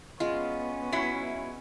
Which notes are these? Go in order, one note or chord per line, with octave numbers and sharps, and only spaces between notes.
G#3 B3 C#4 F4
F#3 E4